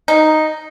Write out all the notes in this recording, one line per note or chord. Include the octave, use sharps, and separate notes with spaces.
D#4